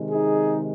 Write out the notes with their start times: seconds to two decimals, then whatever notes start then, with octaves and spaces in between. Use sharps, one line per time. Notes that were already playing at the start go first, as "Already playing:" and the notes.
Already playing: C3 D#3 G#3
0.11 D#4 G#4